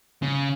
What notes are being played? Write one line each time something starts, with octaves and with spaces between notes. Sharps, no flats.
C#3